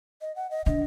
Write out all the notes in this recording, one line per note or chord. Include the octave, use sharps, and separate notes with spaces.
D#5
F#5
D#5
D3 D#5